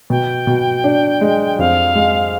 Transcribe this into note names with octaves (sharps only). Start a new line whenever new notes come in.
B2 G5
B2
D4
G#3
F2 F5
G#3